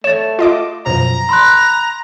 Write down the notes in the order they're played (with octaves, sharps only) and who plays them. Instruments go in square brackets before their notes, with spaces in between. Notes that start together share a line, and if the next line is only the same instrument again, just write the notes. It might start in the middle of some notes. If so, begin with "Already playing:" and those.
[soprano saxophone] A3 [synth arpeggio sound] C#5 [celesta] A6 E7
[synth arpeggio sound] F4 D#5 D6
[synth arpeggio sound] F#2 B2 F3 [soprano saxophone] A#5
[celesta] B5 C6 F#6